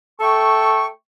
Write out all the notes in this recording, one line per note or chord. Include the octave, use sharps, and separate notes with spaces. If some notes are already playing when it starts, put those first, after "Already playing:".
A3 A4 G5 C#6